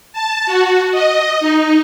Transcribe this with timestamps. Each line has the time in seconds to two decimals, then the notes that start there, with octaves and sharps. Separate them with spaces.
0.13 A5
0.46 F#4
0.92 D#5
1.40 D#4